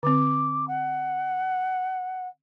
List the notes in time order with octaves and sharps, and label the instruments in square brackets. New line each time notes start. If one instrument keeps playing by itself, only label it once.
[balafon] D3 C4 [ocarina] D6
[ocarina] F#5